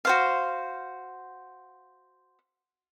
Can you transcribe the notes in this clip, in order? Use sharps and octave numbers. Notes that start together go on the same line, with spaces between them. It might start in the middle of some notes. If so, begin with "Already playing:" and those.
F#4 C5 F5